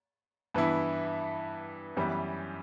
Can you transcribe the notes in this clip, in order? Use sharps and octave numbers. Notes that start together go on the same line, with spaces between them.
G2 E3 B3 E4
F#2 E3 G3 B3